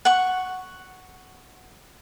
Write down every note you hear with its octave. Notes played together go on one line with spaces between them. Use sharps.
F#5 C#6